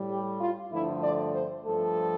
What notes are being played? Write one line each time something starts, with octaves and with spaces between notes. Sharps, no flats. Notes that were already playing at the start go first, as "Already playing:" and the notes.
Already playing: A2 G3
G4
F4
G2 D3 F3 A3 E4
D5
C5
G2 F3 A3 A4